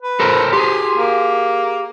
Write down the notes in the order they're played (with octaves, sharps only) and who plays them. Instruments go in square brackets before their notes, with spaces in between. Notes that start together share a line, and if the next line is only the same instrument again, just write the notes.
[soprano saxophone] B4
[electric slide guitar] A4 A#4 C5
[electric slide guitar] G4 G#4 [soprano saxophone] C6
[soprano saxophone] A#3